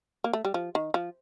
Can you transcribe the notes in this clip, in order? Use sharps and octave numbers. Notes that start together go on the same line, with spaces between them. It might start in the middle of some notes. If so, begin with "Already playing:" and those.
A#3
A3
G3
F3
D#3
F3